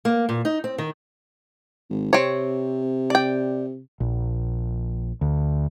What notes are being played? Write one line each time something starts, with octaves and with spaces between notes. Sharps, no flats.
A#3
A#2
D#4
C4
D#3
G#1
C3 C4 C#5
D5 G5
A#1
D2